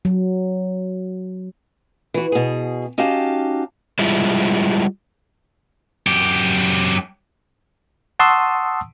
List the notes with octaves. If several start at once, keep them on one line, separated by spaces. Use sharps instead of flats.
F#3
E3 F#4
B2 G#4
C#4 D#4 F#4 G4 F5 A5
G3 G#3 E4 F4
F#2 G4
F#5 A5 C6 C#6 D#6 E6